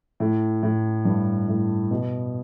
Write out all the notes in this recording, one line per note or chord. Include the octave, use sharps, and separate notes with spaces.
A2
A2
G2
A2
B2